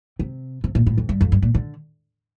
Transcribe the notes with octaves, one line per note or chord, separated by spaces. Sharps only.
C3
C3
A#2
A2
F2
G2
F2
G2
A#2
D3